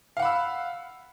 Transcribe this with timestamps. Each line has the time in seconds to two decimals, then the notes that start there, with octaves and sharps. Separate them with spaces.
0.17 F5
0.19 F#5
0.22 B5
0.25 E6